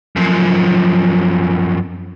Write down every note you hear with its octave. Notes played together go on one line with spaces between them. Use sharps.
F#2 F3